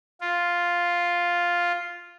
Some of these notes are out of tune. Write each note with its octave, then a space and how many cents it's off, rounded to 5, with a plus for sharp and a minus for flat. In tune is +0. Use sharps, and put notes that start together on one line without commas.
F4 +0